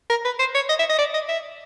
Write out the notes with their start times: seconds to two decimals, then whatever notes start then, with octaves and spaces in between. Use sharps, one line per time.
0.10 A#4
0.25 B4
0.39 C5
0.54 C#5
0.69 D#5
0.79 E5
0.89 D#5
0.99 D5
1.14 D#5
1.29 E5